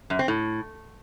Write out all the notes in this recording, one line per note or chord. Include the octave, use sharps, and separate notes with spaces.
F#2
C4
A2